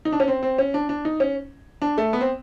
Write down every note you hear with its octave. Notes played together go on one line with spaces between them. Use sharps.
D#4
D4
C#4
C4
C4
C#4
D4
D4
D#4
C#4
D4
A3
B3
C4